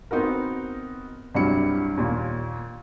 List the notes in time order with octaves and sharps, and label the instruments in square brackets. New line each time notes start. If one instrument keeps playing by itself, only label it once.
[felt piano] B3 C4 D#4 F#4 A#4
C2 G2 F#3 G3 E4 C#7
D#2 A#2